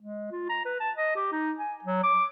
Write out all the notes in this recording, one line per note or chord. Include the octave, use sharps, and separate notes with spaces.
G#3
F4
A#5
B4
A5
D#5
G4
D#4
G#5
F#3
D6